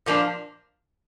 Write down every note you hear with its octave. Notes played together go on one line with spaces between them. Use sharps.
A#2 F3 A#3 D4